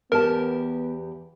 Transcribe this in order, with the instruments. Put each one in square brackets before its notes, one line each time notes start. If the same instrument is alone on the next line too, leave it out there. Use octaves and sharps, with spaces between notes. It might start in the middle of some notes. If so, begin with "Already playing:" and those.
[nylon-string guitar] E2 G4 A5 [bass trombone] B3 [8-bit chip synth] A#4